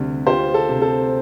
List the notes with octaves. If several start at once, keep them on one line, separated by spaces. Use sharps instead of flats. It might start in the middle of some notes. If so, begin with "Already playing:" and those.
Already playing: D2 C3 G3
F4 G4 C5
A4
C3
A4